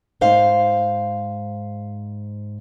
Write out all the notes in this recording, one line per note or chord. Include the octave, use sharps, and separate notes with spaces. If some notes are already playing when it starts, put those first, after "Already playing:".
G#2 C5 F5